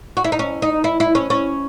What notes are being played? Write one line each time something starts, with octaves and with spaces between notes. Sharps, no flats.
F#4
E4
D#4
C#4
D#4
E4
E4
C#4
C#4